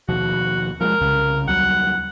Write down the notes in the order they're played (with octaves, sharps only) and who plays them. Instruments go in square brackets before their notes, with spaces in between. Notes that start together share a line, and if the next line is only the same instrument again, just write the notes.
[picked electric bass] D#2 B2 F3 [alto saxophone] F#4
[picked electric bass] F3 G3 G#3 [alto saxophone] A#4
[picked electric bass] C2 C#3
[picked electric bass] D#2 F#3 G3 [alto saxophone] F#5